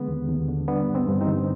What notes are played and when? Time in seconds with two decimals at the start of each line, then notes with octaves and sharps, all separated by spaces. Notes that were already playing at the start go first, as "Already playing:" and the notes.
Already playing: D3 G#3 B3
0.08 D#2
0.28 D#2
0.48 D3
0.68 G3 B3 D4
0.88 G2
0.95 C4
1.08 G2
1.21 C4 D#4
1.27 D3